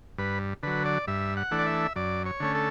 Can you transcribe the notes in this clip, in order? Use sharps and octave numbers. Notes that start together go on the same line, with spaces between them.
G2 B4
D3 F#3 B4
D5
G2 E5
F#5
E3 A3 D4
D5
E5
F#2 D5
C#5
D3 A3 C#4
A4